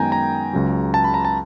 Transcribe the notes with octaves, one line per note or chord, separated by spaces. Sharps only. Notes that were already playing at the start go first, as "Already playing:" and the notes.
Already playing: F#2 D#3 G#3 B3 G5 G#5 A#5
A#5
C#2 C#3 F#3
A5
B5
A#5
A5